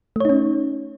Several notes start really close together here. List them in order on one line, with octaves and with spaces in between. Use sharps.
A3 C#5 D#4 C#4